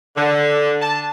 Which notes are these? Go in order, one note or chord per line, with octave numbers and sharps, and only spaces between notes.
D3
A5